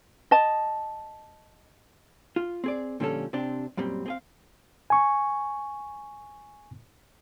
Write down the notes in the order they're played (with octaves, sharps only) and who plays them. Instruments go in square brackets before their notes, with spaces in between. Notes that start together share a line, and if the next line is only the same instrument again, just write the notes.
[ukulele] D#5 A5
[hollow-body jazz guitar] F4
C4 G#4 D5
A#2 D3 F3 G3 C#4 A4
C3 C4 D4 G4
F#2 A#2 G3 C4
C4 G#4 F5
[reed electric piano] G#5 C#6